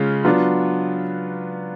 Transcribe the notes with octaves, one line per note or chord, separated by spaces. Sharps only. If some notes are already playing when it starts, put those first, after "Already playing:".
Already playing: C#3 G#3 C#4 F4
F#3 B3 D4 F4